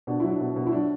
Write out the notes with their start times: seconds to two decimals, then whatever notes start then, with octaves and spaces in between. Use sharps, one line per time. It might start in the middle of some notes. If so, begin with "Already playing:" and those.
0.07 B2 D4
0.20 F#3 E4
0.32 D4
0.40 B2
0.56 B2
0.67 E4
0.72 F#3 D4